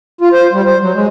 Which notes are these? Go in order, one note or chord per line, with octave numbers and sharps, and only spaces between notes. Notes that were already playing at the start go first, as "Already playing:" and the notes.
F4
C5
G3
C5
F#3
G#3